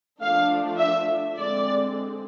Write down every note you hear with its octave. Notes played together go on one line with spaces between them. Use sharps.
F3 A3 D4 F5
E5
D3 G#3 C4 D5